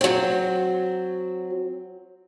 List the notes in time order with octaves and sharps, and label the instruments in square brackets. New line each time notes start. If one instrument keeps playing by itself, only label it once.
[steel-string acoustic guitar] F#3 C4